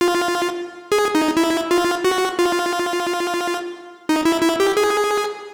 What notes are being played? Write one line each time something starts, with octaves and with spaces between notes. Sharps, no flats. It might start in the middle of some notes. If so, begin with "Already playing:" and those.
F4
G#4
D#4
E4
F4
F#4
F4
D#4
E4
E4
G4
G#4